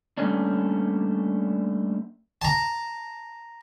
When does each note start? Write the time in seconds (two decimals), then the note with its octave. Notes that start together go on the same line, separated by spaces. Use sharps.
0.18 G3 A3 A#3 C#4 D4
2.42 A5 A#5